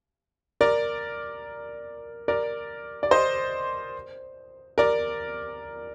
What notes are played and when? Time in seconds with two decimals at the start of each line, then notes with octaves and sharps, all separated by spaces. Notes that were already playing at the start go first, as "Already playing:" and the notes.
0.61 A#4 D5
2.28 A#4 D5
3.03 D5
3.11 C5 D#5
4.78 A#4 D5